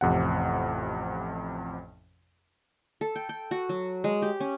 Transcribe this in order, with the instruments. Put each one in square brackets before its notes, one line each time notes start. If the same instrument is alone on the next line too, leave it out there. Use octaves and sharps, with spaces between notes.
[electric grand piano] A1 F2 C3 F#5
[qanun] A4
G5
G5
F#4
F#3
G#3
G4
C#4